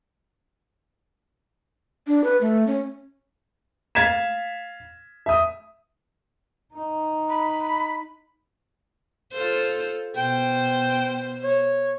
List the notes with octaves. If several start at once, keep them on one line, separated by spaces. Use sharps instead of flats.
D4
B4
A3
C#4
F5 G#6 A6 B6 E7
E5 D#6
D#4
B5
F4 A4 C5
B2 C5 G5
C#5